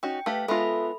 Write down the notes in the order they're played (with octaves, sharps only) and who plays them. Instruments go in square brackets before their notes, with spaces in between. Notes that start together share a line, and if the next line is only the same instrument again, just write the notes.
[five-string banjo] C#4 D#4 F#4 [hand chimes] G5
[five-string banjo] A3 G4 B4 [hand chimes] F5
[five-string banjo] G#3 B3 F4 [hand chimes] A4 E5 B5